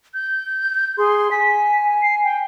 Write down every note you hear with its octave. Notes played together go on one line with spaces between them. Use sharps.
G6
G#4 C6
G#5 B6
C7
G5